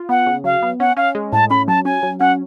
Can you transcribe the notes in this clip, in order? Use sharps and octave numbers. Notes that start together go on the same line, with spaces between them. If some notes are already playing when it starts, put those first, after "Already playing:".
Already playing: F4
B3 F#5
C#3
F#3 F5
B3
C#4 F#5
C#4 F5
G#3
A2 A5
C#4 B5
F#3 A5
C#4 G#5
F#3
C#4 F#5